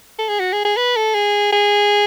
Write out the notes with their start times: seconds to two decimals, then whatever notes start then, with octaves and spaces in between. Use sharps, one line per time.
0.19 A4
0.29 G#4
0.40 F#4
0.53 G#4
0.65 G#4
0.77 B4
0.96 A4
1.14 G#4
1.52 G#4